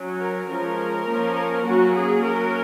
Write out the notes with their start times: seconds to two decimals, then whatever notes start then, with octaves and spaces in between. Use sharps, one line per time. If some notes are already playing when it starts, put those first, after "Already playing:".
Already playing: F#3 C#4
0.20 A#4
0.48 F3 G#3 C#4 A#4
1.07 F3 A#3 C#4
1.64 F#3 A#3 C#4 F#4
1.93 G#4
2.22 F#3 A#3 C#4 A#4